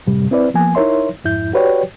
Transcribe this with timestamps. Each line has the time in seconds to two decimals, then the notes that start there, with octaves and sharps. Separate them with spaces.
0.07 F#2 A2 C3 G3
0.31 C4 E4 B4 D5
0.54 F3 A#3 B3 G#5
0.75 D#4 E4 A#4 C#5 E5 C6
1.24 F2 G#2 E4 G6
1.53 F#4 G4 B4 C#5 D5 G5